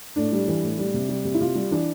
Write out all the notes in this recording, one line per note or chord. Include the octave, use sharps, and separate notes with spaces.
A2 D4
G3
E3
A2
G3
C3
G3
C3
E4
C3 F4
G3
E3 D4